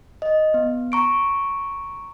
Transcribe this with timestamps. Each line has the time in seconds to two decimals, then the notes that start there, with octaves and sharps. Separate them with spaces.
0.22 D#5
0.54 B3
0.92 A#5 C#6 D7